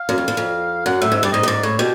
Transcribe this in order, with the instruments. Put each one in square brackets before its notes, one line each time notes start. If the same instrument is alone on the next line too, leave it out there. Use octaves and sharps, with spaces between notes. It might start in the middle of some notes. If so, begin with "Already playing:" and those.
Already playing: [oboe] F5
[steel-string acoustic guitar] F#2
F2
E2
F2
[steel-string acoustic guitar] F#2 [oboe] F#5
[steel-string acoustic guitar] A2 [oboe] E5
[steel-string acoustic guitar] G#2 [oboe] E5
[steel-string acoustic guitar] G2 [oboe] D5
[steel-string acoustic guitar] G#2 [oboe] D#5
[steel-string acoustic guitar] G2
[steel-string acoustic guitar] G#2 [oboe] D5
[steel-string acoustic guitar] A2 [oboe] C#5
[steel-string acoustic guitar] B2 [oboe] G4